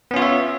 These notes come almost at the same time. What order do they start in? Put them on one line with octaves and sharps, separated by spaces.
B3 C#4 F4 C#5 E5